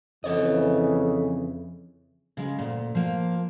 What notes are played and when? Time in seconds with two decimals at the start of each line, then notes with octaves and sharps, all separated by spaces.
0.24 F2 C#3 E3 A4 C#5 D#5
2.37 C#3 G#3
2.59 D2 A#2
2.95 F3 A#3